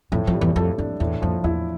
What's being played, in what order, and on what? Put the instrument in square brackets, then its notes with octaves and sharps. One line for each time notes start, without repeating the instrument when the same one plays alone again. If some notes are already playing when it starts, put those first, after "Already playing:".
[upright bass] F2 [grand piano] A2
[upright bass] F2
[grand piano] G3
[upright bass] E2
[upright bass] F2 [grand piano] A4
[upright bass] F2 [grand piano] D4
[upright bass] E2 [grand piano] A2
[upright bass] F2 [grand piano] F3
[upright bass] E2 [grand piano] E4